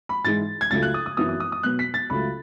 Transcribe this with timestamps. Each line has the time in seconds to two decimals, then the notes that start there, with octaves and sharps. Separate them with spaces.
0.09 B5
0.25 G#2 E3 G#3 A6
0.61 G#6
0.71 C#2 C#3 F#3 A3 A6
0.83 F#6
0.94 D#6
1.06 D#6
1.17 F#2 E3 B3 D#6
1.29 D#6
1.40 D#6
1.52 D#6
1.63 B2 F#3 B3 F#6
1.79 B6
1.94 A6
2.10 C#2 C#3 F#3 A3 B5